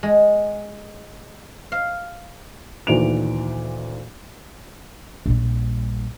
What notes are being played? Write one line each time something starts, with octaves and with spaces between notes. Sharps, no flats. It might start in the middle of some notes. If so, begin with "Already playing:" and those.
G#3
F5
D2 A#2 D#3 E3 D7 F7
A#1 G3